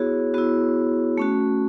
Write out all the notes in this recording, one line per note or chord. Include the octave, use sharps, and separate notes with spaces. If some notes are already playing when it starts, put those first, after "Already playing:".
Already playing: B3 E4 F#4 G#4 C#5
B3 E4 F#4
A3 C#4 F#4